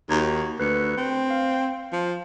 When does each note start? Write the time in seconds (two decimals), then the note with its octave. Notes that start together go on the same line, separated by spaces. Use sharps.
0.10 D#2 F#4 A#5 G#6
0.60 D2 B4 C#7
0.98 C4
1.30 F5
1.93 F3